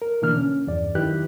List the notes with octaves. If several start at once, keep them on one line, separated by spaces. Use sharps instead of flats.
A#4
B2 D3 E3 A#3 D4 F6
C#4
E2 G2 D5
F#2 D#3 E4 G4 B4 F#6